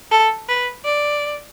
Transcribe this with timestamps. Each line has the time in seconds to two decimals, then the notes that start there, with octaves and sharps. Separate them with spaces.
0.11 A4
0.49 B4
0.85 D5